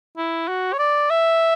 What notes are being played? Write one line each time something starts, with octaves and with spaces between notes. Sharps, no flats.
E4
F#4
C#5
D5
E5